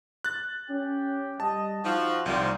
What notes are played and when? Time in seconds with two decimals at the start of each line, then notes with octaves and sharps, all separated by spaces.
0.24 F#6 A6
0.70 C#4 G4
1.40 G3 D#5 A5
1.84 F3 D#4 F#4
2.26 C2 D#3 F3 G3 A#3 C5